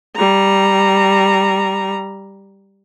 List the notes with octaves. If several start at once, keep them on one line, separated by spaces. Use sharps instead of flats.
G3 A#5